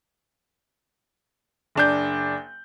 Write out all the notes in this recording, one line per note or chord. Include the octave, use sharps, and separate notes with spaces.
F#1 D4 G6